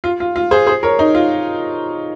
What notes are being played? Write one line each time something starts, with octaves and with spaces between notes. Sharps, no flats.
F4
F4
F4
G#4 C5
G#4 C5
A#4 C#5
D#4
F4